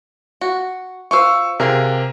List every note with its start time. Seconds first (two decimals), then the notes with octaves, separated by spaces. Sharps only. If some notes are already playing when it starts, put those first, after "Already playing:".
0.41 F#4
1.11 F4 B4 C5 C#6 E6
1.60 C3 F4 G#4 A#4 E5